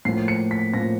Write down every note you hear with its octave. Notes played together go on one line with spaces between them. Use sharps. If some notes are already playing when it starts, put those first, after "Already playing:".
A2 F3 A#3 C7
C#7
B6
A2 F3 A#3 A#6